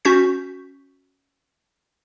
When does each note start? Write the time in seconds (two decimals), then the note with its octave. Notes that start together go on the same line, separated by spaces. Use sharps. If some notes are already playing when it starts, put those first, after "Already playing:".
0.05 C#4 F#4 C#6 G6 B6